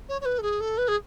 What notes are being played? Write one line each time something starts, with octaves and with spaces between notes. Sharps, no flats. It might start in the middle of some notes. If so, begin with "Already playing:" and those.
C#5
C#5
B4
A4
G#4
A4
B4
G#4